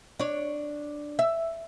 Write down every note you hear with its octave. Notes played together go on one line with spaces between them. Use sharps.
D4 C#5
E5